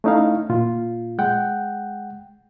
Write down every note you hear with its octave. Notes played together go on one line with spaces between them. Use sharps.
A3 C#4 D#4 E4 F5
A#2 F4
G#3 F#5 G5